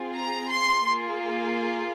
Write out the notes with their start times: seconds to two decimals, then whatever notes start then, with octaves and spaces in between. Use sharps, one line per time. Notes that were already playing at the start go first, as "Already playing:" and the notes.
Already playing: C4 F4 G#4
0.16 A#5
0.51 C6
0.86 A#3 F4 G#4